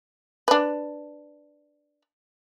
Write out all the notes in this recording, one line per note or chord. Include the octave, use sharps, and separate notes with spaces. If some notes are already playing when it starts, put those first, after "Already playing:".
D4 B4